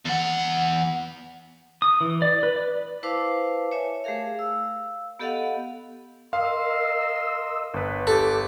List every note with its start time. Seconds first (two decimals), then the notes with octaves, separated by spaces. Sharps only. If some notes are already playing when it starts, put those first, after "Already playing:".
0.05 E2 F#5
1.82 D#6
2.01 E3
2.22 D5
2.43 B4
2.56 D5
3.03 E4 B4 C5 F5 A5 D6
3.72 C#5 E5 G#5
4.04 A3 G4 G#4 A#4 F5
4.35 F5 E6
5.19 B3 G4 A4 D#5 F5 F#5
6.33 A#4 D#5 F5 C6 E6
7.74 G1 B4
8.07 G4 A4